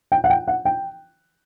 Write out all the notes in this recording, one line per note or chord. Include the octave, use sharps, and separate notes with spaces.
G5
F#5
G5
F#5
G5